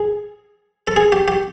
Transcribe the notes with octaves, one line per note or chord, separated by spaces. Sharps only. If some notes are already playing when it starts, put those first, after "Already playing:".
Already playing: G#4
A4
G#4
G4
G4